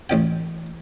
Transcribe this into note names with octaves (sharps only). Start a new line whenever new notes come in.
A1 C#4 G5